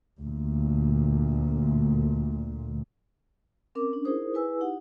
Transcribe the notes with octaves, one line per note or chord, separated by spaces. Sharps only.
D2 A#2
C4 C#4 A#4 D6
C#4 D4
D#4 E4 G#4 A#4 C5 D#6
E4 G#4 B4 G#5 E6
D#4 E4 G4 F#5